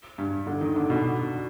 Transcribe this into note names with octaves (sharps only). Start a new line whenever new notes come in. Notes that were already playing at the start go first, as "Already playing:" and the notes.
G2
D3
D#3
D3
B2